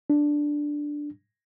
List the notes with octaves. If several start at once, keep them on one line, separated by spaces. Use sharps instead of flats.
D4